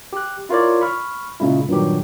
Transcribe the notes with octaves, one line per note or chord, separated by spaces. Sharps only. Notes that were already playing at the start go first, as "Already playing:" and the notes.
G4 F#6
E4 F4 A#4 C#5 D5
B5 C#6 F6
A#2 C#3 G#3 E4
G2 A#2 D#3 F#3 G4